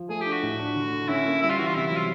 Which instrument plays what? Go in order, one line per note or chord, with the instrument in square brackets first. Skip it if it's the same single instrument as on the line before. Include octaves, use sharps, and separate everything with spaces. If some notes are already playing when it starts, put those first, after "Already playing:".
Already playing: [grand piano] F3
[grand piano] A3 [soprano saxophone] G#4
[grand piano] D4 [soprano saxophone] G4
[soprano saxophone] F#4
[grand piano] A2
D4
D3
D3
[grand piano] C#4 [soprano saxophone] E4
[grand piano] A#3
[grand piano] G3 [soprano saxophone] E4
[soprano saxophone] F4
[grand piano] E3 [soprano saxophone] F#4
[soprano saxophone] F4
[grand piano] C3 [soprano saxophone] E4
[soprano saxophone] E4
[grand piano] F#3
[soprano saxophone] F4